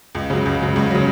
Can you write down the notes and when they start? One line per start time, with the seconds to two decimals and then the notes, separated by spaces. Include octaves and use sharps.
0.15 C#2
0.30 C#3 F#3
0.46 C#2
0.61 C#3 F#3
0.76 C#2
0.90 C#3 F#3